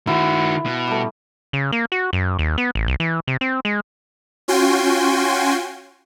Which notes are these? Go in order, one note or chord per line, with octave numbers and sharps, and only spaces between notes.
D#3 E4 F#4 C6
B2
G3 A3
C#3
A#3
F#4
F#2
D#2
B3
A1
C2
E3
C3
C4
G#3
C#4 F4 F#4 G5 G#5 C6